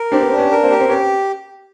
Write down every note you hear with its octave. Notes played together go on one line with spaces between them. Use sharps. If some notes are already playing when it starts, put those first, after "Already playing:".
Already playing: A#4
C4 D4 G4
B3
C4 D4
B3 C#4
A#4
A#3 C4
G4
C4
B3 C#4 G4